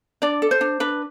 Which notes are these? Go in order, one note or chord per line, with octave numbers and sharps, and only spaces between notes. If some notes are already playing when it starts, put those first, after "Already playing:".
D4 D5
A4
C5
D4
D4 B4